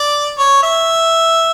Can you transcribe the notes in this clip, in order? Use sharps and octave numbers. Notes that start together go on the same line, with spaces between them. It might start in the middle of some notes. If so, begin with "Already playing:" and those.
Already playing: D5
C#5
E5